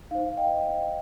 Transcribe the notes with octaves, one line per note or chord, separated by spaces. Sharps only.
D#4 C5 F5
F5
D#5 G5